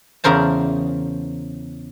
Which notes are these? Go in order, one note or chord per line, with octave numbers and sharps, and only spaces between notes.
E2 C#3 A#4 C5 A5